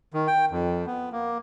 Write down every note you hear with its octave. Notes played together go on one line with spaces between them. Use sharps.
D#3
G5
F2
B3
A#3